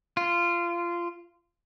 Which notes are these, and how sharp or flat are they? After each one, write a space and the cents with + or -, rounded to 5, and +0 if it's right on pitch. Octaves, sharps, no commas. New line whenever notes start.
F4 -20